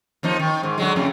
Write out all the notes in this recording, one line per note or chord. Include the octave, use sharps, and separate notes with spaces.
D#2 F3 D#4
D#3
G#2
D3 F#3 G#3
F2 A2 C#3